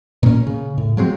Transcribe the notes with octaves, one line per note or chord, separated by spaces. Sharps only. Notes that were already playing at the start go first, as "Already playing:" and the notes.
A#2 A#3 B3 C#4
C#3
A2
F3 F#3 G#3 C4